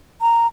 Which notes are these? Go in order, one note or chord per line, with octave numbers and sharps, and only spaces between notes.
A#5